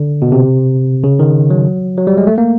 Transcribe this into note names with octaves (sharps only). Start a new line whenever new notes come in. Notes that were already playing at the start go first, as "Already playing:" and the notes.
Already playing: D3
B2
C3
C#3
D#3
F#3
F#3
G3
G#3
A3
A#3